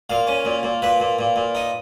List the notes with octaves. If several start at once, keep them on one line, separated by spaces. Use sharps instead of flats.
A#2 F5
C#4
A#2
A#2
A#2 B4
A#2
A#2
A#2
D#4